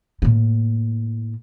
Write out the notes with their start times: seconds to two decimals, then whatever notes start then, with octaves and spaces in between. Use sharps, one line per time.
0.22 A2 A#3